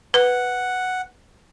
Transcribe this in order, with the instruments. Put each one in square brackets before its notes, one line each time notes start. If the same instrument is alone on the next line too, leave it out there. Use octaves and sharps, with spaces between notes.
[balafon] B4 [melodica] F#5